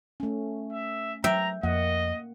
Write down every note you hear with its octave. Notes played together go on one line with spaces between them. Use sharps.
A3 C#4
E5
F#3 E5 G5 A#5
F2 A#3 D#5 F#5